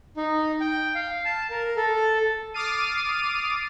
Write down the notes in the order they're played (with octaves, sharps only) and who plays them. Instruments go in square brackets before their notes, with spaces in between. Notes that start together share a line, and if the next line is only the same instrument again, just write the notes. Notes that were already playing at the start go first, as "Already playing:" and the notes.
[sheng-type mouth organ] D#4
G5
F5
A5
A#4
A4
[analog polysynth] D6 D#6 F6 A6 C7 D#7